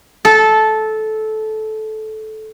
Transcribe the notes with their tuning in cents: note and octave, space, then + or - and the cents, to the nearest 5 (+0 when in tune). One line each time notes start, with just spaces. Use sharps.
A4 -15